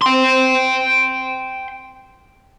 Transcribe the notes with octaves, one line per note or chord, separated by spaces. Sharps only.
G5 C6